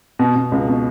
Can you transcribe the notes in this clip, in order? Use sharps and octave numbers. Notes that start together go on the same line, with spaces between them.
B2
B2
C#2
B2